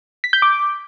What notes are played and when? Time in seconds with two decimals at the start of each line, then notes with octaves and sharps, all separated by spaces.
0.24 B6
0.33 G6
0.42 D6